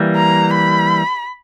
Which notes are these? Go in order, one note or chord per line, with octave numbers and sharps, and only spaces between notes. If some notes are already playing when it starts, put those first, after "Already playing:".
Already playing: E3 G3 A#3
A#5
B5